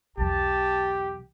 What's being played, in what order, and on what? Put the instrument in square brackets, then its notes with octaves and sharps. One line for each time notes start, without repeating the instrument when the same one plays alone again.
[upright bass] B1 E2 [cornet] G4 [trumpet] A5